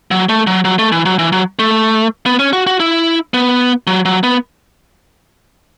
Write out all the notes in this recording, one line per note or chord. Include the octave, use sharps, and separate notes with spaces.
F#3
A3
F#3
F#3
A3
E3
F#3
E3
F#3
A3
B3
C#4
F#4
F#4
E4
B3
F#3
F#3
B3